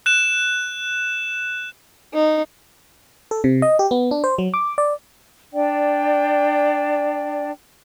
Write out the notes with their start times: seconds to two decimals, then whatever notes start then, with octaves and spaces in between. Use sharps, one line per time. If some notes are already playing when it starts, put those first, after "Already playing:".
0.06 F#6 E7
2.14 D#4
3.31 A4
3.44 C3
3.62 D#5
3.79 G4
3.91 B3
4.11 D4
4.24 C5
4.38 F#3
4.54 D6
4.78 D5
5.53 D4 D5 G5